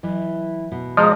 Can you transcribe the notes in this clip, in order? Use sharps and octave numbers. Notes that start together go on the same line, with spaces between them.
E3 F#3
B2
F3 G#3 G#4 D#5 A#5